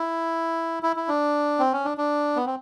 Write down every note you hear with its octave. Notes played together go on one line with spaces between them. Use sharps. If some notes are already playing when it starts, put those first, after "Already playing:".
Already playing: E4
E4
E4
D4
C4
C#4
D4
D4
B3
C4